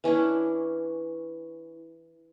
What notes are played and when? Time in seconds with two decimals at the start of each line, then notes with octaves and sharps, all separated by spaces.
0.04 E3 C#4 D4 E4